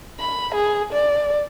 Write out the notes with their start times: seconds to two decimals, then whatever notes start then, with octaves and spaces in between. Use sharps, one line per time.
0.20 B5
0.54 G#4
0.92 D5